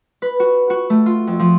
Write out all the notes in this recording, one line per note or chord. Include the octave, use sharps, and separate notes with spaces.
B4
F#4
F#4
A3
F4
F2
F3